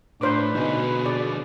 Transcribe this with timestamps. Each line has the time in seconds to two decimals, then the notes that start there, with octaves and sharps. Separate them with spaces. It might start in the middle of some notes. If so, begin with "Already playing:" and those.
0.21 A2 D4 B4 C5 D6
0.55 B2 D3 D#4 G#4
1.06 D5